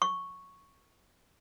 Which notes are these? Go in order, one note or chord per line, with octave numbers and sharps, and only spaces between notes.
C#6